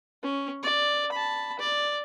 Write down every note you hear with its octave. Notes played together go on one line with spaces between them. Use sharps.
C#4
D5
A5 B5
D5